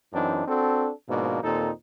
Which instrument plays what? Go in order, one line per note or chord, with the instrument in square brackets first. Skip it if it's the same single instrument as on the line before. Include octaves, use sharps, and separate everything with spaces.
[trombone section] F#2 E3 C4 D4 D#4
C4 D4 F#4 A4
G#2 B2 F3 A#3 D4
D#2 A#2 C4 D#4 A4